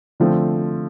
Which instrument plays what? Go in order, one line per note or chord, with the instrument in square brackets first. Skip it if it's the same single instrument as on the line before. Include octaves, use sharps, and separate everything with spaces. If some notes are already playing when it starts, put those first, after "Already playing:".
[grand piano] D3 F3 A3 C4